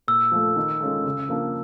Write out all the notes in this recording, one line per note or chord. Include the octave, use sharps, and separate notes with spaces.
A#2 E6
F3 A3
D#3
G#3 C#4 F4 A4
C#3
F3 A#3 D4